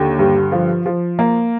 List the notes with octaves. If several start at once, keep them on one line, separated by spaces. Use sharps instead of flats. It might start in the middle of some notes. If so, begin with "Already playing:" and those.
Already playing: D#2 D3
G2
F3
F3
A#3